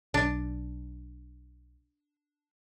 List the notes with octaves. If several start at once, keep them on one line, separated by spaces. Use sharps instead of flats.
B1 D4